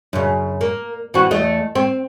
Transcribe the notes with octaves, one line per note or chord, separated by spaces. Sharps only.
F#2 C#3
A#3
E3 C4 F#4
E2 A3 D#5
C4